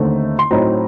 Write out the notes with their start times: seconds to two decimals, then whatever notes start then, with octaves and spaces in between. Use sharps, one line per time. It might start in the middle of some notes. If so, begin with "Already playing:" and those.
Already playing: D#2 D3 A3 C4 D#4
0.39 C6
0.51 A2 F#3 C4 D#4 A#5